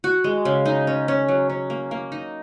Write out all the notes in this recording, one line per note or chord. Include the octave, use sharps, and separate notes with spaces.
F#4
G#3
C#3
D#4
C#4
C#4
F#3
C#4
A#3
A#3
D#4